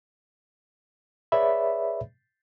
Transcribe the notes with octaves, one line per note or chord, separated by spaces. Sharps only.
G#4 B4 C#5 D5 E5 B5